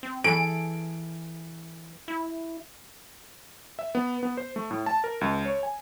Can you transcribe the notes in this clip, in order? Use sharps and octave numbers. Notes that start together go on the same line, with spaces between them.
C4
E3 G#4 A4 D7
E4
E5
B3
B3
C5
A3
A2
A5
A#4
C#2
C#5
G#5